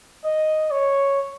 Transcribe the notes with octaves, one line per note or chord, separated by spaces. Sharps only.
D#5
C#5